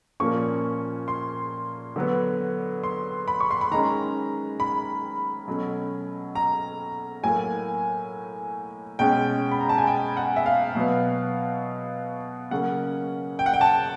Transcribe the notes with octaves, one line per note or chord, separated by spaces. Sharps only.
A#2 F3 A#3 C#4 C#6
C6
D3 F#3 B3
C6
B5
C#6
C6
B5
D#3 G#3 C#4 A#5
B5
B2 F#3 A3 C#4
A#5
A2 F#3 A#3 G#5
B2 G#3 C#4 G5
B5
A#5
A5
G#5
G5
F#5
E5
F5
B2 F#3 B3
C#3 F#3 A#3 C#4 F#5
G5
F#5
G5
A5